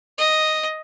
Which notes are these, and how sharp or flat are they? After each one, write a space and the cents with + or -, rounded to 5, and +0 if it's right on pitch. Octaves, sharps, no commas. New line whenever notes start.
D#5 +0